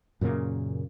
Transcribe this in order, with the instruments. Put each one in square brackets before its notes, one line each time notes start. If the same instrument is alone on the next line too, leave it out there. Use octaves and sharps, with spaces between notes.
[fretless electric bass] F#2 A#2 C#3 A#3